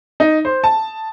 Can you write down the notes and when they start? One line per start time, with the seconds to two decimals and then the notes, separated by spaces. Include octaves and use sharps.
0.20 D#4
0.45 C5
0.64 A5